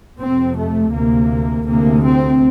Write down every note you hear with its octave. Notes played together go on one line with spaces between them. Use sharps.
F2 C3 C4
A3
D2 C3 A#3
D2 C3 A#3
C4